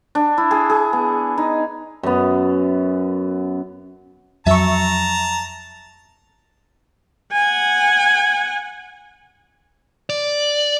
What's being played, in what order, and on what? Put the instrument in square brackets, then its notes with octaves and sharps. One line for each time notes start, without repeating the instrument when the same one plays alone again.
[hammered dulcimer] D4
E4
G#4
G#4
B3
D#4
F#2 B3
[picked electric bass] F2 F#3 [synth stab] E5 C#6 [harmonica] A5 A#5
[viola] F#5 G#5
[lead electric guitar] D5